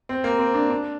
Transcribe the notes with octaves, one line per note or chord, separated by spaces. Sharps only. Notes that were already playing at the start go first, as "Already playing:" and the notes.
C4
A#3
C4
D4
D4